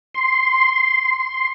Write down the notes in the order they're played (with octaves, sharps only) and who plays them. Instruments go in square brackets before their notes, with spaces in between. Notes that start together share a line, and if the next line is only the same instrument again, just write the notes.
[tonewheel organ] C6